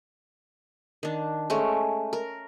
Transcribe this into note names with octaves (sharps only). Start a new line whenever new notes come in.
D#3 D4
G#3 A3 C#4
A#4